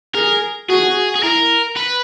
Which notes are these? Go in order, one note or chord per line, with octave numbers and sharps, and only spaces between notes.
G#4 A#4
F#4 G#4
G#4
E4 A#4
B4